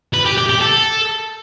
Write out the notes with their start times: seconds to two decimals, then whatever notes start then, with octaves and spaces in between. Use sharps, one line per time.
0.14 B4
0.26 G4
0.37 G4
0.49 G4
0.61 A4